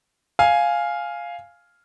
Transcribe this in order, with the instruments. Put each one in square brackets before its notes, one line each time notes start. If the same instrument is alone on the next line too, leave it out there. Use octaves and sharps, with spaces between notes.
[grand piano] F5 G#5